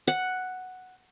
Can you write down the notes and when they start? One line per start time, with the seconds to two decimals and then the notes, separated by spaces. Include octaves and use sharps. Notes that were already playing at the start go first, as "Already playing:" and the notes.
0.08 F#5